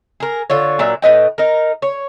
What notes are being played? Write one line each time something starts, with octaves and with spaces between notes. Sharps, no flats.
G#4 A#4
D3 F4 C#5
A#2 F#3 D4 E5
A2 B4 D#5 G5
D#4 A#4
C#5